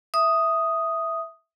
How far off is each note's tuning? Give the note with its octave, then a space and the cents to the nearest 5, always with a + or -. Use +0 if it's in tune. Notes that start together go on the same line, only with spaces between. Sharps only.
E5 +0 D#6 +0